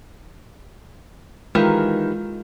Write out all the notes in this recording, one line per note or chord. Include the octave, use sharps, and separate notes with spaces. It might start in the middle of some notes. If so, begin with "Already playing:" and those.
D#3 E3 G#3 F4 G4 A#4